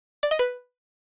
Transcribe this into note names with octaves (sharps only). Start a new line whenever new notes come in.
D5
D#5
B4